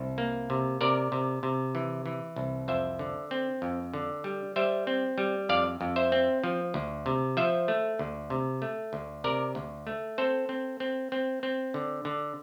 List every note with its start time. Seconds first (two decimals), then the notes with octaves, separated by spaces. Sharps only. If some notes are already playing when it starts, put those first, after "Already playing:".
Already playing: C2
0.18 A#3
0.50 C3
0.81 C3 A#4 D5
1.12 C3
1.43 C3
1.75 E3
2.06 E3
2.36 C2
2.68 F2 C5 E5
2.99 D3
3.31 C4
3.62 F2
3.94 D3
4.24 G3
4.56 G3 C5 E5
4.87 C4
5.18 G3
5.49 F2 D5 F5
5.81 F2
5.96 C5 E5
6.12 C4
6.44 F3
6.74 D2
7.06 C3
7.37 F3 C5 E5
7.68 A3
7.99 D2
8.30 C3
8.62 A3
8.93 D2
9.24 C3 A#4 D5
9.55 D2
9.87 A3
10.18 C4 A4 C5
10.49 C4
10.80 C4
11.12 C4
11.43 C4
11.74 D3
12.05 D3